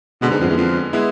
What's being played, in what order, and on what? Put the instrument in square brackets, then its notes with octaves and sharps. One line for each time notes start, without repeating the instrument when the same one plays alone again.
[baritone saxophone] B2 [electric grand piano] D3 G#3 B3
[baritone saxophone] G#2
F2
E2
F2
[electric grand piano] G#3 B3 E4